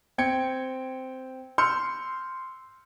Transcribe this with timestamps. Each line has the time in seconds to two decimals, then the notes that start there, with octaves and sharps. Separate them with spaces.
0.18 C4 G5 G#6 C#7
1.58 C6 E6 F6 G6 C#7